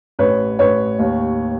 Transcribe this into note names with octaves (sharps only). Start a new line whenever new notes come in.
A1 B4 C#5
A1 B4 C#5
D#2